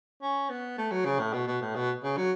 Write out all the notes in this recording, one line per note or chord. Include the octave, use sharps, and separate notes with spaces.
C#4
B3
A3
F#3
C#3
A2
B2
B2
A2
B2
C#3
F#3